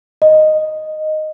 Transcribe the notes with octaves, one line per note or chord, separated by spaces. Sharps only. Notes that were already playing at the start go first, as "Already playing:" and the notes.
D#5